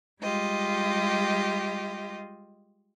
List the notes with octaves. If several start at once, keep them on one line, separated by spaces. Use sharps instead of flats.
G3 G#3 F4 G4 D#5